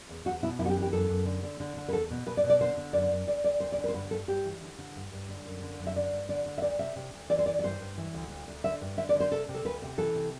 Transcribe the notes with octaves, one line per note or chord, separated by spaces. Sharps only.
E2
E2 F#4
B2 E4
F#2 E4
F#4
G4
E3
G4
F#2 A4
F#2
D3
D3
D3
D3
B4
E2 A4
B2
B2 B4
D5
B2
D5
D3 C5
D3
F#2 D5
F#2
D2 D5
D2 D5
D2 C5
D5
D3
B4
C5
G2 B4
G2 A4
G2 G4
E3
D3
D3
G2
G2
D3
F#2
D3
F#2
E5
D3 D5
G2
D3 D5
D3
E5
D2 D5
C3 E5
C3
D2
E3 D5
C5
E3 D5
D5
G2 C5
G2
E3
D2
D2
D2
D3 E5
G2
D3 E5
D5
D3
C5
C3 A4
C3
A4
D2 B4
C3
E3 A4
C3